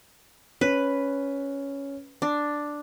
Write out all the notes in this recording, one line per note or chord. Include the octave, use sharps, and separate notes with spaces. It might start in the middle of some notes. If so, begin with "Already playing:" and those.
C#4 B4
D4